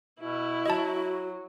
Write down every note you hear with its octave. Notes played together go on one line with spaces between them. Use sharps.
B2 E4
F#3 F#4 D#5 A5